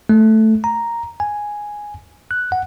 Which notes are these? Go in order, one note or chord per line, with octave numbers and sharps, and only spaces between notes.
A3
A#5
G#5
F#6
F#5